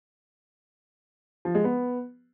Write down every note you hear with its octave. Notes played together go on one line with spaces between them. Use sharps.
F3
G#3
B3